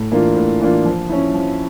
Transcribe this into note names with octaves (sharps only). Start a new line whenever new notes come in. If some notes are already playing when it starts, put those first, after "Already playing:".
Already playing: A2
E3 A#3 D4 F4
A2
E3 A#3 D4 F4
F3
C#4 E4
F3